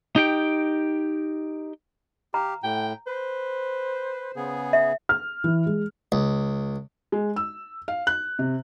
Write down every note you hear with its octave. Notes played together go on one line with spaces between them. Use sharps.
D#4 G4 G5
G4 F5 A#5
A2 G5
B4 C5
C#3 B3 G#4
E5
F6
E3
G#3
C#2
G#3
E6
F5
F#6
C3